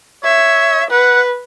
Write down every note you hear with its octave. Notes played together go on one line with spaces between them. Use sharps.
C#5 E5
B4 F#5